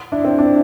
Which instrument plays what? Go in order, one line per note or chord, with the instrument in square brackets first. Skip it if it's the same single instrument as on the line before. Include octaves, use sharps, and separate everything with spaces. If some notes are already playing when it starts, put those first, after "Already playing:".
[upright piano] D4 [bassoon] E4
[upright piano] C4
D4